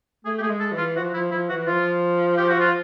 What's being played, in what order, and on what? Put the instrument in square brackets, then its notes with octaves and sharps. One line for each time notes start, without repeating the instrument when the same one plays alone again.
[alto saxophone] A3 [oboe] G#4
[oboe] G4
[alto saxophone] A3 [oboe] G#4
[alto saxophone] G#3
[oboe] A4
[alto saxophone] E3
[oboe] F4
[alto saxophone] F3 [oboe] F#4
[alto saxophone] F3 [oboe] E4
[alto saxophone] F3 [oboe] E4
[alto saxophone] E3 [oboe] F#4
[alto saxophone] F3 [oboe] F4
[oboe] G4
F#4
F4